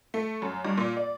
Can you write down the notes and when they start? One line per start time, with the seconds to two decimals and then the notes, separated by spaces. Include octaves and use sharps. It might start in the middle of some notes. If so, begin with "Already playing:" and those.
0.14 A3
0.42 F#2
0.65 G2
0.78 A#2
0.97 D5